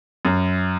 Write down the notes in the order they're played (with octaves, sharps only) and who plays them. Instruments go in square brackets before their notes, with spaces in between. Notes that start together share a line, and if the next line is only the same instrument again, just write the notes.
[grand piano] F#2